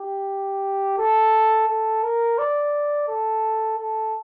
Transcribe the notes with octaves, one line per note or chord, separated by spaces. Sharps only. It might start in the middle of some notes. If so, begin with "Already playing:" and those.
Already playing: G4
A4
A4
A#4
D5
A4
A4